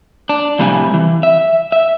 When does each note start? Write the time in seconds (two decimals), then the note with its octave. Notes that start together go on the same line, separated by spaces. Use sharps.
0.29 D4
0.59 F2 A2 C3 G3 E4 G#5
0.94 E3
1.23 E5
1.72 E5